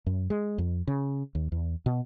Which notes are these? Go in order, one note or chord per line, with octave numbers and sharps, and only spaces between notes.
F#2
G#3
F2
C#3
D#2
E2
B2